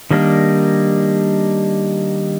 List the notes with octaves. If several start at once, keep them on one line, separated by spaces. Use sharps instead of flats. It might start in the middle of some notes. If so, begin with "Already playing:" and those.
D#3 G3 A#3 D4